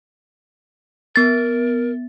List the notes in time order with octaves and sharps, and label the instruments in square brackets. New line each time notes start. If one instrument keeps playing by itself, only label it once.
[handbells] B3 A6 [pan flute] A#4